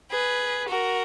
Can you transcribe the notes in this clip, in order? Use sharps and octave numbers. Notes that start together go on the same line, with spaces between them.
G#4 B4
F#4 A#4